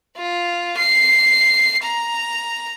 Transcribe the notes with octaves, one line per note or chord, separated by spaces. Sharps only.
F4
C7
A#5